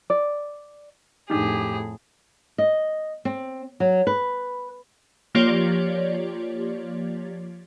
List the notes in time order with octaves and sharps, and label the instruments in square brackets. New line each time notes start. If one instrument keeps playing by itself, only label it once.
[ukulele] D5
[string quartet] F2 A2 [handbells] D4 D#4 [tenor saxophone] G4 [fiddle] G#4
[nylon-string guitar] D#5
C4
F#3
B4
[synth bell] F3 A#3 F4 G4 C#5 D5